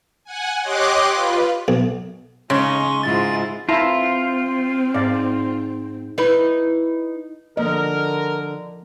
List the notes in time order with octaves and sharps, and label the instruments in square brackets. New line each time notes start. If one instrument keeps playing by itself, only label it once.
[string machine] F#5 G#5
G4 C#5 D#5 C6 D6 F#6
F4 B4
[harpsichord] B1
[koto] C#3 [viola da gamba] G#3 C#4 D#4 [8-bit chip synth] C6 C#6
[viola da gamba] G#2 E4 F4 [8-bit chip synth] A6
[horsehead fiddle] C4 [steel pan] E4 A5 A#5 [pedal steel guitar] F4
[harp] G#2 [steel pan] D5 F5
[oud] D#4 E4 B4
[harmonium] D3 [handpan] F3 A#3 D#5 [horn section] A#4